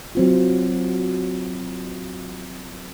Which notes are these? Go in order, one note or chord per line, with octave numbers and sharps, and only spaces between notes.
F#3 C4 F4